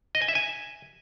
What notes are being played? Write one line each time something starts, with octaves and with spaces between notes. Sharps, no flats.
D#5
G#5
E5
G#5